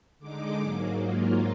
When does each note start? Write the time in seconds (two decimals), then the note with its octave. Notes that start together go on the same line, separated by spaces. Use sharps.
0.19 D3 G#3 D#4 D6
0.60 G#2 F#3 A#3
1.02 G#2 F#3 A#3 F4